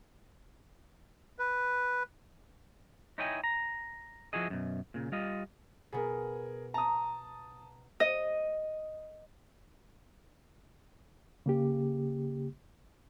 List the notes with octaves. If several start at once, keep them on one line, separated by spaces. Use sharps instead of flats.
B4
D#4 E4 C#5 D#5 G5 G#5
A#5
F3 E4 F#4 G#4 D#5
F#2 B2
A#2 C#3
G3 F4 D#5
B2 B3 G#4 A#4
A5 A#5 D#6
D#5
C#3 A#3 G4